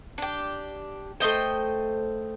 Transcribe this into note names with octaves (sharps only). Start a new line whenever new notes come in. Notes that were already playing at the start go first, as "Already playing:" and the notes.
D4 G4
A3 C5 D#5 G5